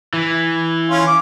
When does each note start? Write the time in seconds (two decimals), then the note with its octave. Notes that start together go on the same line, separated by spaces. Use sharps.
0.14 E3
0.90 C#4 F4
1.07 D6